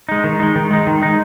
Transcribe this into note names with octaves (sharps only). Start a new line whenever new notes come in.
G#3 D#4
D#3
G#3 D#4
D#3
G#3 D#4
D#3
G#3 D#4